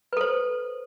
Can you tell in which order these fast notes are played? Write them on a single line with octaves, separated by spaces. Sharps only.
B4 A4 C5